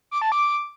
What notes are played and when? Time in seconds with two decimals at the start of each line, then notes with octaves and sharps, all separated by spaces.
0.11 D6
0.22 A5
0.32 D6